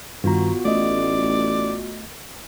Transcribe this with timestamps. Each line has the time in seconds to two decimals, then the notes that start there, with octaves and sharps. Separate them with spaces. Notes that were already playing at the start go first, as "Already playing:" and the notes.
0.24 G2 D#3 B3 F4 F#4 A#5
0.65 A1 A3 D5 D#5